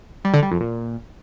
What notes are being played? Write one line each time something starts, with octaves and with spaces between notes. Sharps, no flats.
G3
D3
G3
F2
A#2